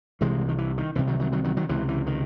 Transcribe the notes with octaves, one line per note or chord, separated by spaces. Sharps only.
C2 C3 E3 G#3
D#3
E3
D#3
C2 C3 E3
D#3 F#3
D#3 F#3
D#3 F#3
D#3 F#3
D#3 F#3
C#2 C3 E3
E3
D#3